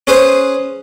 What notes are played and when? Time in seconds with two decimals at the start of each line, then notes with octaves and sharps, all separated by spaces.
0.07 C#4 G#4 B4 C5